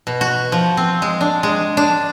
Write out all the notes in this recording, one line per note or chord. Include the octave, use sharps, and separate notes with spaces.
B2
F#4
F3
C4
G#3
D4
G#3
D4